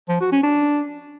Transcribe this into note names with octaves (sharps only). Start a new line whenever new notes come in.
F3
F#4
C#4
D4